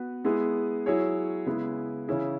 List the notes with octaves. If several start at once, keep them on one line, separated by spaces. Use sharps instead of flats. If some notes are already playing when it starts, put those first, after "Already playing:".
Already playing: B3 F#4 B4
G#3 B3 E4 G#4
F#3 E4 G#4 C#5
C#3 G#3 B3 E4 G#4
C#3 E3 C#4 E4 G#4